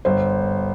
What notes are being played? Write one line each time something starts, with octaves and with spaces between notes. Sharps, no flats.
G1 C5